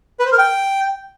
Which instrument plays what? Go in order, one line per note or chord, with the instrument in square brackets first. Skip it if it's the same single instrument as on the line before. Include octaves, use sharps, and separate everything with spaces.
[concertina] B4
C5
A#4
G5